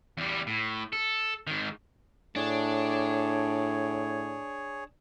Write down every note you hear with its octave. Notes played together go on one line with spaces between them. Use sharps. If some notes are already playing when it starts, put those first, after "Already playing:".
E2 G3
A2
A4
G#2 D#3
A2 D4 G#4 C#5